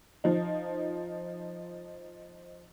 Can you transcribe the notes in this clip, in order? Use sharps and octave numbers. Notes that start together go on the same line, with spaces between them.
F3 D#4